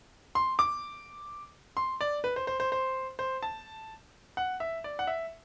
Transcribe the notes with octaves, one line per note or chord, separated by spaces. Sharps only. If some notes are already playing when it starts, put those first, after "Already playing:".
C6
D6
C6
D5
B4
C5
C5
C5
C5
C5
A5
F#5
E5
D5
F#5
E5